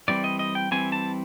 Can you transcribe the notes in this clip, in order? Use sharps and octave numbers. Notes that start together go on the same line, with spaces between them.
E3 G3 C4 D5
D#5
D#5
G5
E3 G3 C4 G#5
A5